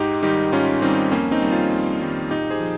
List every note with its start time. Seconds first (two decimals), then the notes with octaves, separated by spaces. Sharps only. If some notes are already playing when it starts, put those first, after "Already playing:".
Already playing: G#2 D#4 G4
0.22 D#3 G3 D#4 G4
0.52 G#2 C#4 F4
0.82 D#3 G3 C4 D#4
1.11 F2 A#3 C#4
1.31 C4 D#4
1.42 D#3 G3
1.51 C#4 F4
1.72 F2
2.01 D#3 G3
2.30 A#2 D#4 G4
2.50 G#4 C5
2.60 F3